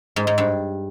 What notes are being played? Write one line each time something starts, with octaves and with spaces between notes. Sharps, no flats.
G#2
G#2
G2